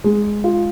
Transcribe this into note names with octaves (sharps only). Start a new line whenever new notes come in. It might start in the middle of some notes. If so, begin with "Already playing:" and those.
G#3
F4